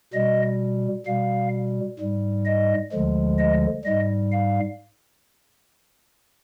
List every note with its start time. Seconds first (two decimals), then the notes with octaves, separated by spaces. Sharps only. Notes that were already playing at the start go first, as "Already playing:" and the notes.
0.14 B2 G3 D#5
1.06 B2 G3 F5
1.99 G#2 G3
2.46 D#5
2.92 D2 D3 F3 G#3
3.39 D#5
3.85 G#2 G3 D#5
4.32 F5